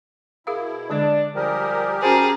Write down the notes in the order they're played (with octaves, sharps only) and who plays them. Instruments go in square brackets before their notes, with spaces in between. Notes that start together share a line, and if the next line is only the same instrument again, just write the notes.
[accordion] B2 E4 [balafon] G#4 A#4 F5
[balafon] D3 G#3 D5 [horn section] D4
[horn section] F3 G3 G#4 [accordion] G4 A#4
[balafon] C#4 F#4 C5 [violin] G#4 [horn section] G5 A5 A#5